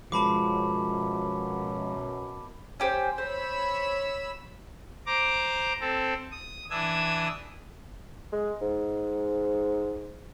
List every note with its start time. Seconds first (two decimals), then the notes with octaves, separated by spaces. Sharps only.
0.12 F#2 B2 F3 G#3 A5 B5 D6
2.80 C#4 G4 C5
3.18 C5 C#5 B5 E6
5.06 C5 A#5 D6
5.80 C4 A4
6.31 D#6
6.70 E3 D4 D#6 E6 G#6
8.32 G#3
8.61 G#2